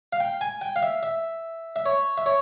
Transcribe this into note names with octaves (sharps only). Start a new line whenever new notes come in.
F5
G5
G#5
G5
F5
E5
E5
E5
C#5
E5
C#5